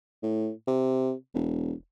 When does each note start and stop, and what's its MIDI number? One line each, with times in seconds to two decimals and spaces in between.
0.23 0.51 45
0.67 1.13 48
1.34 1.73 28